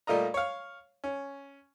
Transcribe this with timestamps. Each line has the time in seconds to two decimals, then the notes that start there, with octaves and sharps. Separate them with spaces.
0.07 A#2 G3 A3 F4 D#5 A#5
0.34 C#5 F5
1.04 C#4